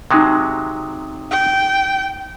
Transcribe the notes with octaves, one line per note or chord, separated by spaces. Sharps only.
C3 F#3 G#3 D#4 D#6
G5